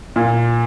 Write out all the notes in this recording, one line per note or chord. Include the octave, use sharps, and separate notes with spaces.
A#2